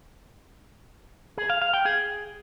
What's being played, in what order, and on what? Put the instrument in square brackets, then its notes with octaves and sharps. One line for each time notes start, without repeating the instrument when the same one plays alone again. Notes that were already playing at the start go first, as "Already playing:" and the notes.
[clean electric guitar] G#4
F5
F5
G5
G#4